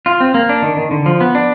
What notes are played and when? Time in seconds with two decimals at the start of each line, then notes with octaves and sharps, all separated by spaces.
0.06 F4
0.20 C4
0.34 A#3
0.49 D4
0.62 D#3
0.77 D#3
0.91 D3
1.06 F3
1.20 B3
1.35 D4